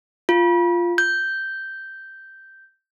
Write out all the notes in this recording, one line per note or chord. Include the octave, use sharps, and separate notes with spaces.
F4
G6